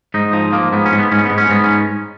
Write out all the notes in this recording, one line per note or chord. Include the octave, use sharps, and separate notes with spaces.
G#2 D#4
F3 D#4
F3 A#3
G#2 B3
C#4
G#2
B3
G#2 C#4
G#2 B3
C#4
G#2 B3
C#4